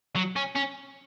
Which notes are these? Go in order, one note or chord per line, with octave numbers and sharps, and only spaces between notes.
F#3
C#4
C#4